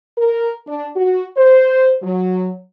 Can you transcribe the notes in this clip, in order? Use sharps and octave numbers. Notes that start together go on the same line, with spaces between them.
A#4
D4
F#4
C5
F#3